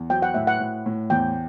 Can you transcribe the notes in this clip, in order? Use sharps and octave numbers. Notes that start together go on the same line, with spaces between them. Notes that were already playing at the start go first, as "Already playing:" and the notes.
Already playing: E2
F#3 G5
F#5
A2 E5
F#5
A2
A2
E2 G5